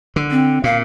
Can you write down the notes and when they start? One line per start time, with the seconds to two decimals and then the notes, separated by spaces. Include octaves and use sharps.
0.16 D3
0.31 C4
0.64 A#2 F5